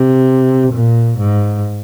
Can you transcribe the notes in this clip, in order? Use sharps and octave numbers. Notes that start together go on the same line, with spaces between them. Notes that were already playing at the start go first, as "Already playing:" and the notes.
Already playing: C3
A#2
G#2